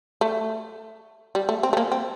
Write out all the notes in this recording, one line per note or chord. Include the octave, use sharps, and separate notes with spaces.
A3
G3
A3
C4
A3
A#3
C4